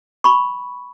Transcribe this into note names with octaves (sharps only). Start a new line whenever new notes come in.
B5 C#6